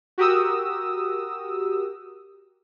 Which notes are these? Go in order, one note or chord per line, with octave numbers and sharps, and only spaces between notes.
F#4 G4 A#4 D#6 E6